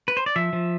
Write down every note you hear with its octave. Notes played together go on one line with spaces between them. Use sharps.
B4
C5
D5
F3 E5
F3